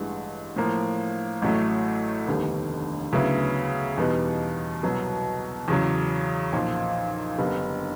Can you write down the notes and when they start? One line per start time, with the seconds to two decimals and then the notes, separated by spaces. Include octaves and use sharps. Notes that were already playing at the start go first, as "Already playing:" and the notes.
Already playing: A1 G2 E3 G#3
0.56 A2 F3 A#3
1.42 A1 A2 F#3 A3
2.27 F1 D#2 D3 G3 B3
3.13 D2 C#3 F#3 B3 E4
3.97 E2 B2 G3 B3 D#4
4.83 C2 B2 F#3 B3
5.68 E2 C#3 F#3
6.53 B1 A#2 F3
7.38 F#1 F#2 D3 G3 B3